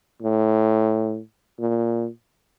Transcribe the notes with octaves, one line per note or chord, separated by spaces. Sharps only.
A2
A#2